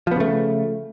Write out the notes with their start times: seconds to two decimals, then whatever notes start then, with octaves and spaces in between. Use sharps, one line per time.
0.07 F3
0.11 B3
0.16 C#3
0.20 A3